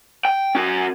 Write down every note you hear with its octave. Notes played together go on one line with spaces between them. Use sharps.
G5
C#4 F#4